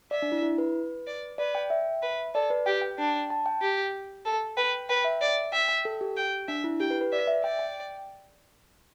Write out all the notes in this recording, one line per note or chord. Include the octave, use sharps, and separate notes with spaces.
D5 E5
D4
E4
E4
B4
D5
B4 D5
G5
E5
B4
A4 D5
B4
G4 G5
G5
D4
A5
G5
G4
A4
B4 G5
B4 G5
E5
D5
E5 G5
G5
A4
G4
G5
D4 E5
E4
G4 G5
B4
B4
D5 E5
E5
D5 G5
G5